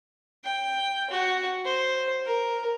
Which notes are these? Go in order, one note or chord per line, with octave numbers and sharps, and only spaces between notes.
G5
F#4
C5
A#4